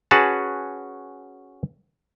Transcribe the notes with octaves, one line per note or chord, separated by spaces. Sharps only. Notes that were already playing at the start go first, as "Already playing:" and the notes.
C#4 F#4 G#4 B4 F#5 A5